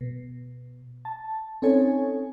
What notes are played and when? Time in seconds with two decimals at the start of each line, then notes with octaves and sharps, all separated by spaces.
0.01 B2
1.05 A5
1.62 C4 C#4 D#4 A4 C#5 G#5